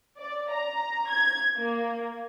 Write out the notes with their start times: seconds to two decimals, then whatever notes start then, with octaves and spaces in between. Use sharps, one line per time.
0.18 D5
0.52 A#5
1.10 G#6
1.56 A#3